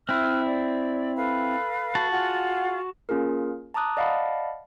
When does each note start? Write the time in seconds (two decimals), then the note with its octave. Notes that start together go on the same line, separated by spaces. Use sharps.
0.09 C4 E4 E5 F6 F#6
0.45 D5
1.16 A4 B4 F5
1.95 F#4 A5
2.11 F4 G#4 F#5
3.09 A#3 C#4 F4 G#4 A#4
3.74 A5 A#5 D6 D#6 F#6
3.97 D5 D#5 F5 F#5 A5 B5